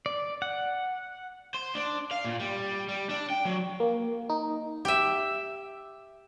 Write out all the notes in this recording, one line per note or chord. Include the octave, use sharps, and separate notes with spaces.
D5
F#5
C5
D4
F5
A#2
G3
G3
D4
G5
F#3
A#3
D#4
G4 E5